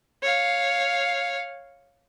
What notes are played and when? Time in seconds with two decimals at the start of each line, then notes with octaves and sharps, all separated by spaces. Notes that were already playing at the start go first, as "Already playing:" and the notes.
0.22 C#5 F5